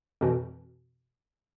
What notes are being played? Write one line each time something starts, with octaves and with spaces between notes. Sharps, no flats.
F2 B2 E3